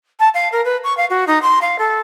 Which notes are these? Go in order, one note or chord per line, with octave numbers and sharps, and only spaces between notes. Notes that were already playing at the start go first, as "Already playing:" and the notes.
A5
F5
A#4
B4
C#6
F5
F#4
D#4
C6
F5
A4